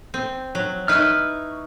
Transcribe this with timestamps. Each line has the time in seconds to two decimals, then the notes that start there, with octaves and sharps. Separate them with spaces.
0.14 C4
0.55 F#3
0.88 D#4 E4 B4 C#6 F6